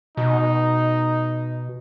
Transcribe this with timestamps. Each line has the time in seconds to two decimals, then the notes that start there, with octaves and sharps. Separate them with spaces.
0.17 B2 D#4